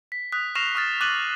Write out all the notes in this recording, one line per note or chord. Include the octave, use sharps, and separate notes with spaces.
B6
D#6 F#6 B6
C#6 F6 A#6 C7 E7 F7
C#6 D#6 F6 A6
D6 F#6 A6 D#7 F#7